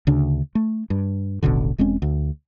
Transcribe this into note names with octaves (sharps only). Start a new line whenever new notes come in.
D2 C#3 D4
A3
G2
D#1 A1 B2 D3
E1 G#3 C4 C#4
D2